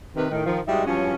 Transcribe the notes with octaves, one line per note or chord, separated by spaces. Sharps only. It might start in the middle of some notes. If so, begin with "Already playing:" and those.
C3 D#3 B4
A2 D#3
D#3 F3
G2 G3 G#3 D#4 F#4 E5
G2 F3 F#3 C#4